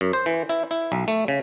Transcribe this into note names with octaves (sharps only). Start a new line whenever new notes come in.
F#2
C5
E3
E4
E4
B1
A3
C#3